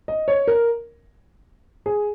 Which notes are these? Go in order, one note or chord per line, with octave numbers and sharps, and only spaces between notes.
D#5
C#5
A#4
G#4